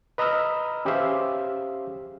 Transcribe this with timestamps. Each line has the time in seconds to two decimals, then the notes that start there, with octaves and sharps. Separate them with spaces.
0.18 B4 D#5 A#5 B5 E6 F6
0.85 C#4 G4 G#4 C5 E5 F5